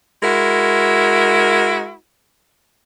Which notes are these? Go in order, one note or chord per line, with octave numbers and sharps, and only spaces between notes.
G#3 E4 F#4 A#4